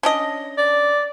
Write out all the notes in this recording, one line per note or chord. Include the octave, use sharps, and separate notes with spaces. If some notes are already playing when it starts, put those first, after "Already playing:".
C#4 D4 D#5
D5